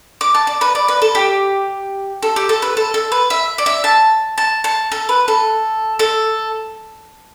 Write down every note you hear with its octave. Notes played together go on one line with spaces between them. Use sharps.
D6
A5
D5
B4
D5
B4
A4
G4
A4
G4
A4
B4
A4
A4
B4
E5
D5
E5
A5
A5
A5
A4
B4
A4
A4